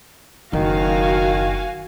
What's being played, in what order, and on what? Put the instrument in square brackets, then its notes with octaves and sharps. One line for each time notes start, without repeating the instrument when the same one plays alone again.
[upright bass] F#1 [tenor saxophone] D#3 [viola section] F#4 F5 G#5